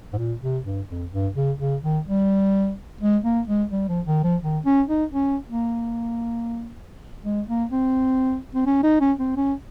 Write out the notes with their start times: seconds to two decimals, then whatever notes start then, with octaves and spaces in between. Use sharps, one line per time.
0.13 G#2
0.17 A#2
0.42 C3
0.65 G2
0.89 F2
1.11 G2
1.35 C#3
1.60 C#3
1.83 D#3
2.06 G3
3.01 G#3
3.24 A#3
3.48 G#3
3.71 G3
3.88 F3
4.06 D#3
4.24 F3
4.42 D#3
4.66 C#4
4.88 D#4
5.12 C#4
5.48 A#3
7.25 G#3
7.48 A#3
7.71 C4
8.55 C4
8.66 C#4
8.83 D#4
9.00 C#4
9.19 C4
9.37 C#4